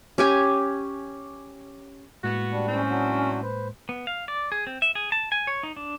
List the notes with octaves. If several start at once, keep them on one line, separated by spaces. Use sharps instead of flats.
C#4 G4 G#5
A2 G#3 A#3 B3 F#4
G3 D4
E3 C4 C#4
F#3 D4 F#4
B4 C5
B3
F5
D5
G#4
C4
E5
G#4
A5
G#5
C#5
D#4
D4